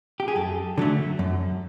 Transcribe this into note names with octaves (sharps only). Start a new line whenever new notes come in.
G4
G#4
F#2 A4
D3 F#3 A3
F#2